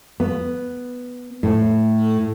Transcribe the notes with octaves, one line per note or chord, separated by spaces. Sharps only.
B3
A2